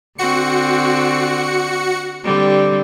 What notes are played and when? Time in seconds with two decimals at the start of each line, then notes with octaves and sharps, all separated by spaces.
0.18 D3 C4 F#4 C#7
2.23 D3 G3 C4